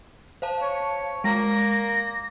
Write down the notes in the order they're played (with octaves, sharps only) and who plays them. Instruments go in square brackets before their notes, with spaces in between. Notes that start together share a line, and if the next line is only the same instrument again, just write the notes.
[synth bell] C5 F5 A5
[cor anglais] C#5
[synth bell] G#3 [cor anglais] A#3 [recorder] A#6